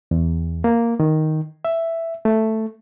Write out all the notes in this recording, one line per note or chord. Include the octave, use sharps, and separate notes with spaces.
E2
A#3
D#3
E5
A3